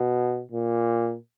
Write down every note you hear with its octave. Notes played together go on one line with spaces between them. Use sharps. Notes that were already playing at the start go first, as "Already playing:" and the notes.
Already playing: B2
A#2